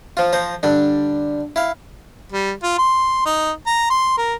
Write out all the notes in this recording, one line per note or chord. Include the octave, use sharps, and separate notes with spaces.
F3 F4
F3 C5 A#5
D3 G3 D4
E4 F5
G3
F4
C6
D#4
A#5
C6
A#4